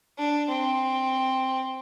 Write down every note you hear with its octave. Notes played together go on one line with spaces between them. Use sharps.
D4
C4